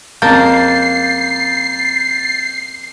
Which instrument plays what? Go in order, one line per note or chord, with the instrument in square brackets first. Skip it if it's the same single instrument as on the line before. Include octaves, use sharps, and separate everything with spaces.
[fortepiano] F2 C#3 A5 [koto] A#3 [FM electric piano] G6 A6 [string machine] C7